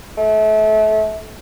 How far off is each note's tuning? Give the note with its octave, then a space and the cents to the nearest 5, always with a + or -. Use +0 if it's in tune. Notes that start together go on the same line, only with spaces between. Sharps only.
A3 -30